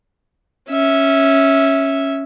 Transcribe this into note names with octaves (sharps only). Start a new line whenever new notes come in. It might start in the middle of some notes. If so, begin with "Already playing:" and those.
C#4 E5